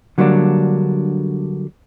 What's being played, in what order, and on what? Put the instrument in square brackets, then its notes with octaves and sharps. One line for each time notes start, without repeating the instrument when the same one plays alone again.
[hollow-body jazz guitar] D3 F#3 G3 A#3 C4 D4